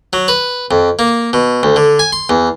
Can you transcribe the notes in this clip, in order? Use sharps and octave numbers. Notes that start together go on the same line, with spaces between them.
F#3
B4
F2
A#3
B2
D2
D3
G#5
C6
E2